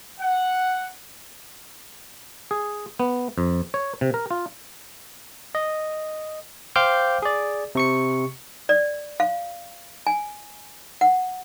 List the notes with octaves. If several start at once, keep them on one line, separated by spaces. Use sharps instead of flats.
F#5
G#4
B3
F2
C#5
C3
A#4
F4
D#5
C5 F5 G5 D6 F6 G6
G#4 D5
C3 C#6 C#7
D5
F5
G#5
F#5